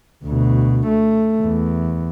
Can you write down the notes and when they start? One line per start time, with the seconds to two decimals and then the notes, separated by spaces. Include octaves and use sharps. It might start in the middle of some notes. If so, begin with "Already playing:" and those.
0.25 D2 B2
0.87 A3
1.42 E2